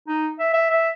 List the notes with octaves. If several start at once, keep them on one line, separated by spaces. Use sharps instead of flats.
D#4
E5
E5
E5